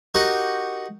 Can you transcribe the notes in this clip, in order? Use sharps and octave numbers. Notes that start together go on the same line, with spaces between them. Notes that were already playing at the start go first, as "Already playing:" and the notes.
D#4 F#4 G4 A#4 F#5